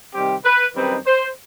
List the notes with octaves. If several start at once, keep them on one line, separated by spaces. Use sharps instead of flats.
C3 D#3 G3 C4 G4
B4
F#2 D#3 G3 C4 D#4 B4
C5